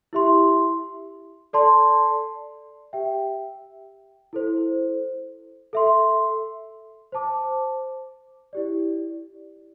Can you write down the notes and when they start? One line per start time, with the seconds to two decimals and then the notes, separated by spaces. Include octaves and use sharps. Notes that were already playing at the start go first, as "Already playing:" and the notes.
0.13 E4 G4 E5 C6
1.53 A4 D5 A5 C6
2.93 G4 E5 G5
4.33 E4 A4 C5
5.73 A4 E5 C6
7.12 C5 A5 D6
8.53 E4 G4 D5